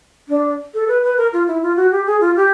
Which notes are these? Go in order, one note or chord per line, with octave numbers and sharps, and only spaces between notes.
D4
A4
B4
B4
A#4
F4
E4
F4
F#4
G4
G#4
F4
G4